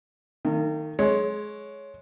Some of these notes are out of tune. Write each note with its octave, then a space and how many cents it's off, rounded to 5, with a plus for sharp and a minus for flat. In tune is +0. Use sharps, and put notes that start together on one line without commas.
D#3 +0 A#3 -40
G#3 +20 C#5 +0